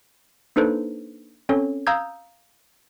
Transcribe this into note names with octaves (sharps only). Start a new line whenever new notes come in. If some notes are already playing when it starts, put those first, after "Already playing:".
A#3 D4 D#4 A4 B4 C5
C4 C#4 A4 C#5
F5 A#5 D#6 E6 G6 G#6